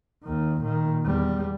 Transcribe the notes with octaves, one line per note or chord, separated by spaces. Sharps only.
D#2 D#3
A#2 D#3
E2 G3